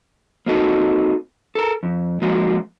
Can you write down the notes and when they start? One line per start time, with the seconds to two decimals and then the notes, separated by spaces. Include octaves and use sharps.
0.46 A#3 C4 D#4 F#4 A4
1.55 A4 A#4
1.83 F2
2.22 F3 G#3 A#3 F#4